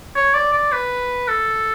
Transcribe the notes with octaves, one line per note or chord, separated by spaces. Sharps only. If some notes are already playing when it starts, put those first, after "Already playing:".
C#5
D5
D5
B4
A4